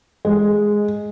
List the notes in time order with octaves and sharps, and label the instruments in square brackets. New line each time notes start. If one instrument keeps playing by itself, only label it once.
[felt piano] G#3